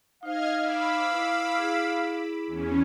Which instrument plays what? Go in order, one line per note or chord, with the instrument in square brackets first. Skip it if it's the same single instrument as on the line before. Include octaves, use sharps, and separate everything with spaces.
[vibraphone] D#4 C5 [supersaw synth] D#5 F6 G#6 [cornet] F5
[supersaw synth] B5 D6 E6
[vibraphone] E4 B4
E4 G#4
[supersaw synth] E2 C#4